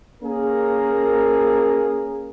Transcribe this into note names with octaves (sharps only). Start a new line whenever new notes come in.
A#3 C#4 G#4 A#4